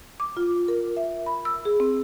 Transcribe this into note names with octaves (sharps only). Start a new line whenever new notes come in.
D6
F4
A#4
E5
B5
E6
G#4
C4